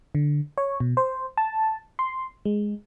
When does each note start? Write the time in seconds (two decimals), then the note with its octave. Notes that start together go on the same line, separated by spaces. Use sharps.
0.15 D3
0.58 C#5
0.80 B2
0.97 C5
1.37 A5
1.99 C6
2.45 G#3